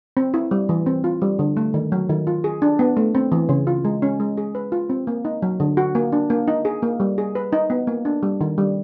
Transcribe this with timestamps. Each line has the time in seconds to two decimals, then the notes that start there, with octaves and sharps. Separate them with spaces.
0.17 C4
0.34 E4
0.51 G3
0.69 E3
0.86 C4
1.04 F4
1.22 G3
1.39 D3
1.57 A3
1.74 D#3
1.92 F#3
2.09 D#3
2.27 F4
2.44 G#4
2.62 D4
2.79 B3
2.97 A3
3.15 C4
3.32 E3
3.49 C#3
3.67 F4
3.85 G#3
4.02 C#4
4.20 G#3
4.37 G#4
4.55 B4
4.72 F4
4.90 C4
5.07 A#3
5.25 D#4
5.42 F#3
5.60 D3
5.77 F#4
5.95 A#3
6.12 D4
6.30 A#3
6.48 D#4
6.65 G#4
6.82 A#3
7.00 G3
7.18 G#4
7.35 B4
7.53 D#4
7.70 B3
7.87 A#3
8.05 D4
8.23 G3
8.41 D#3
8.58 G3